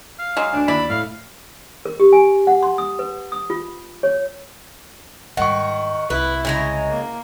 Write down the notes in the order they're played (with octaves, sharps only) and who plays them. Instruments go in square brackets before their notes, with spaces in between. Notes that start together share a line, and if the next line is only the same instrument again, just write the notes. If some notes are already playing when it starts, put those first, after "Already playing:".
[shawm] F5
[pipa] F#3 G#3
[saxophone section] D2 D4 [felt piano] G#5
[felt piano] D#2 [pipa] E4 D5 [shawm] B5
[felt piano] A2 [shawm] F5
[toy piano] A#4
G4
G#5
F#5
C6
D#6
B4
D#6
F4
C#5
[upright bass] G#2 G3 [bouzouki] D#3 [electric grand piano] F#5 C#6
[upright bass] C2 [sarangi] E4 [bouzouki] B4
[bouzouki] C#3 G#3 A#5
[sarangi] A#3